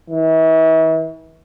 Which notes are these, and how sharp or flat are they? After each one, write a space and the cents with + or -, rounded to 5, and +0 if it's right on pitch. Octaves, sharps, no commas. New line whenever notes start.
E3 -40